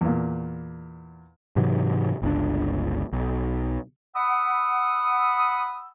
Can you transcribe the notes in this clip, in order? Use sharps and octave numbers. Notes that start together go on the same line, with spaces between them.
E2 A#2
G#2 C3 E3 F#3
G1 C#2 D4
B1
F#5 B5 D#6 E6